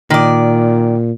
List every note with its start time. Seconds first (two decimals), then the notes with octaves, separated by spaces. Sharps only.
0.10 A#2 D#3 D5